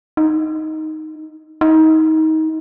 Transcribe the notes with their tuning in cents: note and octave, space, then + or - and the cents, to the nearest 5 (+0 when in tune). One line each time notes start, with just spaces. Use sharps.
D#4 +5
D#4 +25